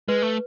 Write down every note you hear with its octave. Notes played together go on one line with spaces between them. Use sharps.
G#3 B4
A3